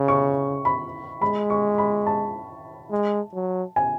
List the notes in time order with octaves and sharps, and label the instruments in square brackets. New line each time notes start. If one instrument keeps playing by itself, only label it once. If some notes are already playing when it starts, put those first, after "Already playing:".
Already playing: [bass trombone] C#3
[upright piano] C#6
B5
[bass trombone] G#3 [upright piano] B5
[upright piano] C#6
B5
A5
[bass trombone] G#3
F#3
[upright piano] G#5